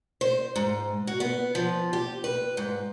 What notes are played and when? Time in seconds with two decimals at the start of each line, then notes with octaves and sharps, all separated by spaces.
0.21 C5
0.56 G#2
1.07 F#4
1.20 B3
1.55 F3
1.93 G4
2.24 B4
2.57 G#2